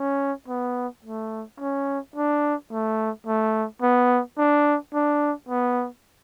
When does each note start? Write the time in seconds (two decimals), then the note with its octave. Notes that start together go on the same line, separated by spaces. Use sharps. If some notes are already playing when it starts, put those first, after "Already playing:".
Already playing: C#4
0.48 B3
1.05 A3
1.60 C#4
2.16 D4
2.72 A3
3.27 A3
3.82 B3
4.38 D4
4.94 D4
5.49 B3